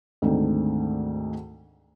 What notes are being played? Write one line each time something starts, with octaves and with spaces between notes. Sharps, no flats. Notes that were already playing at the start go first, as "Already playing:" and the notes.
D2 G#2 D#3 C4 D4 A4